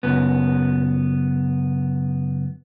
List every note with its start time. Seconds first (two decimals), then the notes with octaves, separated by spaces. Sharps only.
0.03 C#2 F#2 B3